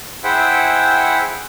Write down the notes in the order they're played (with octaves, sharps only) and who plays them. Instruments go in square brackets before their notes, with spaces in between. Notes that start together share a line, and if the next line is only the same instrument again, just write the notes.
[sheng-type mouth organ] E4 G#4 C5 E5 F#5 G5